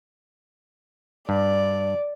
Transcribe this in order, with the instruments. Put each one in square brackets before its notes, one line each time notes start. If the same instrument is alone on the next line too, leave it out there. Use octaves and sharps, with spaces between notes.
[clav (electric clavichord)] G2 [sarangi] D5